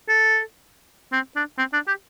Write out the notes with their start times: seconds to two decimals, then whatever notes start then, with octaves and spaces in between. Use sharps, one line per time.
0.09 A4
1.13 C4
1.36 D4
1.58 C4
1.73 D4
1.88 G4